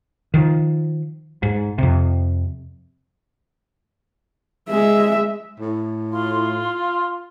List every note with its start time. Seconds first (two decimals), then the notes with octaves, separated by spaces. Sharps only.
0.34 D#3 F3
1.43 G#2
1.78 F2 C3
4.70 G#3 E5
5.59 A2
6.12 F4 C6